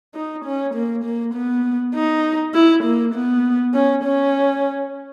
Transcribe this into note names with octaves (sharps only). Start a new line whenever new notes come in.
D#4
C#4
A#3
A#3
B3
D#4
E4
A#3
B3
C#4
C#4